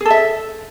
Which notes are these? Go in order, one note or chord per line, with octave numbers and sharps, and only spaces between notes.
G#4 A4 E5